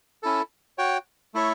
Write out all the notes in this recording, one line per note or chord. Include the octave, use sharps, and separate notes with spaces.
C#4 E4 A4
F#4 C#5 G5
A3 E4 A4 C#5